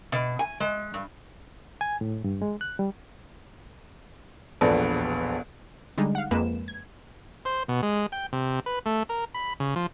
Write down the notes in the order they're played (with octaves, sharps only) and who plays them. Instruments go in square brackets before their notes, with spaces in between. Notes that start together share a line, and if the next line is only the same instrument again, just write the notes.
[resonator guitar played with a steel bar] B2
G#5
G#3
G2
[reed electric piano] G#5
A2
G2
G#3
F#6
G3
[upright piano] E1 A#1 D4 A4 B4
[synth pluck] D3 G3 G#3 D#4
F5 F#5
F2 G#3 A#3 B4 E7
G#6
[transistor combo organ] C5
B2
G#3
G5
C3
B4
A3
A#4
B5
C#3
F3